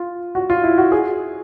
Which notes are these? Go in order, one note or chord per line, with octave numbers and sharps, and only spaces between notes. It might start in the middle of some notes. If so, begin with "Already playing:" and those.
Already playing: F4
F#4
F4
E4
F#4
G#4